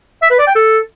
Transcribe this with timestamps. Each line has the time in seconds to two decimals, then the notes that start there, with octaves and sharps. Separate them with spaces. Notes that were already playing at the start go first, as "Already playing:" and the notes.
0.22 E5
0.30 B4
0.39 D5
0.47 G5
0.55 A4